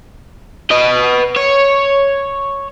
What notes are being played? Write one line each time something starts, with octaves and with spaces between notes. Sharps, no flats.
B4 D#5
C#5